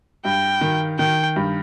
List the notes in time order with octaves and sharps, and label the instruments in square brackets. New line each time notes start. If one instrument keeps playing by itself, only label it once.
[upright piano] G2 [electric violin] G5
[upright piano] D#3
[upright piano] D#3 [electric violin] G5
[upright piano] G2